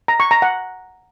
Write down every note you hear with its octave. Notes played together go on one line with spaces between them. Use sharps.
A#5
C#6
A#5
F#5